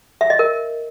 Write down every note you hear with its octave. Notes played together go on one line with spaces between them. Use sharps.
E5
D#5
A#4